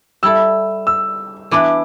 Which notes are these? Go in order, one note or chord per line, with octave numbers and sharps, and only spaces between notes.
G3 E4 A4 E6
E6
E3 B3 D4 B4 D6